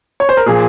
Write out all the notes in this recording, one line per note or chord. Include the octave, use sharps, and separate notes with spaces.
C#5
C5
A#4
A#2 F3 G#4